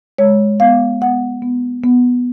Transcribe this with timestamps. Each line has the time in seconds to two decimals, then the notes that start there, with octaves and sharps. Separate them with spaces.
0.18 G#3 C#5
0.60 B3 F5
1.01 B3 F#5
1.42 B3
1.83 B3